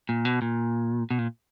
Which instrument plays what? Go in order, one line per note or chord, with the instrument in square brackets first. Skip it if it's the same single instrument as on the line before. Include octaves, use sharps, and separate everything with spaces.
[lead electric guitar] A#2
B2
A#2
B2
A#2